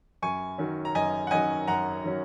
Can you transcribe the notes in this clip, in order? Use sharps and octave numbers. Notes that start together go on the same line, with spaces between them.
F#2 G#5 C#6
D#3 F#3 C#4
A#5
F#2 D#5 G#5
F#5
D#3 F#3 C#4 D#5 G#5
F#2 F#5 A#5
D#3 F#3 C#4